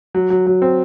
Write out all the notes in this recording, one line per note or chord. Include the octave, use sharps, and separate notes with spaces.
F#3
F#3
F#3
C4